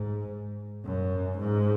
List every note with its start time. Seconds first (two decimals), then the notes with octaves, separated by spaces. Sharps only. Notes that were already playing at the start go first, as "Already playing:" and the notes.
Already playing: G#2
0.85 F#2
1.39 G#2